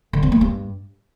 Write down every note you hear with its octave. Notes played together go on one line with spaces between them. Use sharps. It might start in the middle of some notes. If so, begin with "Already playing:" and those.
D3
C4
A#3
G2